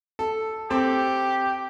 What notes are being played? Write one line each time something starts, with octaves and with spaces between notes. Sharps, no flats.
A4
C4 G4 A4 A5